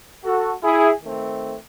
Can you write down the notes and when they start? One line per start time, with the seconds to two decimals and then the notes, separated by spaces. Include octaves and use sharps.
0.24 F#4 A4
0.63 E4 G#4
1.01 D#3 A3 C4